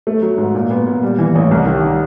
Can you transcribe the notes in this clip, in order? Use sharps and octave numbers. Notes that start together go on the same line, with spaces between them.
A3
F#3
G#2
A#2
B3
A#2
G3
E3
A1
C2
D#3